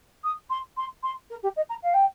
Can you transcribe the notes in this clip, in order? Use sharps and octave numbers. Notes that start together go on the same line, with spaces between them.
D#6
C6
C6
C6
A#4
G4
D#5
A#5
F5
G5